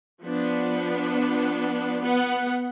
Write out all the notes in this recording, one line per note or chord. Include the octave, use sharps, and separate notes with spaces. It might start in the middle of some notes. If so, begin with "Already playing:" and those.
F3 B3 D4
B3 F#5